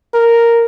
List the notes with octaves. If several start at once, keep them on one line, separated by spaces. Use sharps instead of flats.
A#4